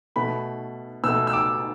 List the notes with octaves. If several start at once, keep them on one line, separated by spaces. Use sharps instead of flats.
B2 A3 B5
B2 A3 E6
E6
D6